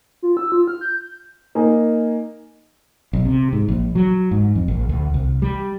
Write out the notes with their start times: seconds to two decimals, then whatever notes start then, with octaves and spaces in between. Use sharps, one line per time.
0.22 F4
0.37 E6
0.52 F4
0.68 F6
0.81 G6
1.55 A#3 D#4 G#5
3.13 B1
3.25 C3
3.53 G#2
3.68 A#1
3.95 F#3
4.31 G#2
4.55 F2
4.68 A#1
4.89 D2
5.14 C2
5.42 G3